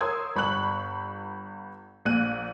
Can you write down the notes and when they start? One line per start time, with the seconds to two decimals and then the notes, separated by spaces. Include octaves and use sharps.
0.01 A#4 C#5 C6 D#6 E6 G#6
0.36 G1 B5 C#6 F#6 F#7
2.05 A#1 A#2 F#6 D#7